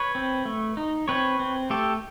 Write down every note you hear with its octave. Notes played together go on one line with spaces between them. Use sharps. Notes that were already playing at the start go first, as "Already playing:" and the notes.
Already playing: B4 C#5
C4
A3
D#4
C4 B4 C#5
C4
A3 G4 A4